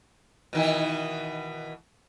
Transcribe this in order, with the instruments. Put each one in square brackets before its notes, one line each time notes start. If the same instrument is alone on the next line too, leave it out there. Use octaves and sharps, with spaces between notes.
[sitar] B2 D#3 E3